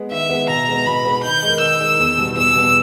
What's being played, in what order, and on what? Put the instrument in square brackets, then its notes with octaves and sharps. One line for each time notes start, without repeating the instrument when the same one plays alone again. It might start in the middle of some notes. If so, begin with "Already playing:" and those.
Already playing: [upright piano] G#3 B3
[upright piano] D#3 [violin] E5
[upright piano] G#3 B3
[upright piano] B2 [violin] A#5
[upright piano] G#3 B3
[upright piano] B2 [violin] B5
[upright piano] G#3 B3
[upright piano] D#3 [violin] G6
[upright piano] G#3 D#4 A#4
[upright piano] D#3 [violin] E6
[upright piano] G#3 D#4 A#4
E2
B2 G3 B3
[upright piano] E2 [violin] E6
[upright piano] B2 G3 B3